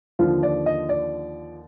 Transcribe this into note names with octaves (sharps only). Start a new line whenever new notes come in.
D#2 D3 F3 F4
D5
D#5
D5